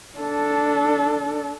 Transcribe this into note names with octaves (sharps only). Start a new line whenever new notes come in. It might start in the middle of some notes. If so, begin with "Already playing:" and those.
D4 A4